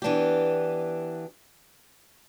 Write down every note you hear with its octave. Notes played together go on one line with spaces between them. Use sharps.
E3 B3 D4 G4